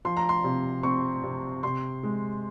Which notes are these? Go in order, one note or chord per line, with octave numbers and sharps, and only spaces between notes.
F3 C6
A#5
C6
C3
C4 C#6
C3
C3 C6
G#3